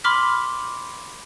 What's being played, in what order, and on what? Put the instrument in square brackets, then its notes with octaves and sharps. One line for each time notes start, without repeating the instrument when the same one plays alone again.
[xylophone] B5 C6 D6 F6 B6